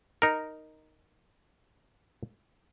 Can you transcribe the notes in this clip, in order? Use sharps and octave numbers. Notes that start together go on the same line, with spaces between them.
D#4 A#4